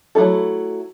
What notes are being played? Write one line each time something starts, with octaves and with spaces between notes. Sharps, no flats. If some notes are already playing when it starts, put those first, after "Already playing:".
F#3 A3 E4 A4